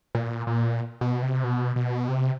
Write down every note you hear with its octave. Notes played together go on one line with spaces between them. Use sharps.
A#2
A#2
B2
C3
B2
B2
C3